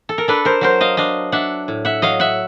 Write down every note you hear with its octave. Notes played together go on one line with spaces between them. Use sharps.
A4
A#4
D4 A4 B4
A#4 C5
F#3 A#4 C5
D#5 F5
D4 D#5 F5
D4 E5 F#5
A2
E5 F#5
F#3 D#5 F5
E5 F#5